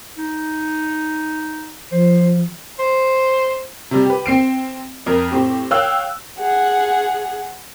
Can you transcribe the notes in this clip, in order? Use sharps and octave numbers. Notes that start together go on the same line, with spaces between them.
D#4
F3 C5
C5
C3 G3
G4 B4
C4 C7 D7
F2 A#4
A2 C4 G4
C#5 F5 G5 E6 F#6
G#4 F#5